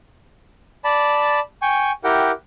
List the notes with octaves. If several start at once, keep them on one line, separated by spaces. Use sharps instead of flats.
D5 A5 B5
G5 G#5 C#6
E4 G4 A#4 F#5 G5